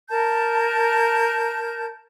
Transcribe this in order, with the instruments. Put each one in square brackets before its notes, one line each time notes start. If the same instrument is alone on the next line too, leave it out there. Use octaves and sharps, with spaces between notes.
[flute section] A#4 A5 G6